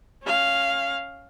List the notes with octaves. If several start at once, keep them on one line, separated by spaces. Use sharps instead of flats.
C#4 F5